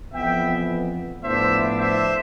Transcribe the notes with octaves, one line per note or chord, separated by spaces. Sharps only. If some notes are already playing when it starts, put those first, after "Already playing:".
F2 E3 B3 E5 G5
A2 F3 B3 D4 C5 E5
C5 E5